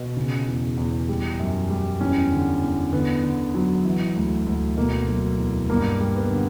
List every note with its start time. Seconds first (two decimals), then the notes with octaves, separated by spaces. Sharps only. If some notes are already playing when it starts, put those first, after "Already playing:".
Already playing: B2
0.17 C#3
0.47 E2
0.78 E2
1.09 G3
1.39 F#2
1.70 G3
2.01 E2 C#4
2.32 D3
2.62 E2
2.93 D3 B3
3.24 D3
3.55 F#3
3.85 E3
4.16 D2
4.46 D2
4.77 B2 A#3
5.08 F#3
5.38 E2
5.69 G2 A#3
6.00 G3
6.16 B3
6.31 D3